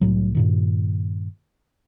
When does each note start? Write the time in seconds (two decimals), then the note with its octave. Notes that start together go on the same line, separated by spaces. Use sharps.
0.01 C2 A2 F#3
0.35 G2 A#2 D#3